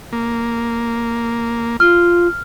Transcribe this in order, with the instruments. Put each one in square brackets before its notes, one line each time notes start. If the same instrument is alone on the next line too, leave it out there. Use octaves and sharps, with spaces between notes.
[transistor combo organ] A#3
[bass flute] F4 [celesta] F6